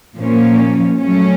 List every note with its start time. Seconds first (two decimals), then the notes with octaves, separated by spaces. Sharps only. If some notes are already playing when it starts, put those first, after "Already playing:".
0.16 A#2 F3 A#3 C#4
0.99 F#3 A3 C#4